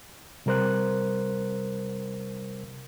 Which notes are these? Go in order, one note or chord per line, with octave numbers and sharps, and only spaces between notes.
C3 G3 A#4 C5 F#6